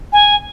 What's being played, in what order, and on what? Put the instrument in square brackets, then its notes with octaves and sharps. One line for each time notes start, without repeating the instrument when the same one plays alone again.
[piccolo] G#5